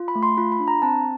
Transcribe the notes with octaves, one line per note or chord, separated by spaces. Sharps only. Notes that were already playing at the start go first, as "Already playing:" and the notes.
Already playing: F4
B5
A3
C6
F4 B5
B5
D4
A#5
C4 A5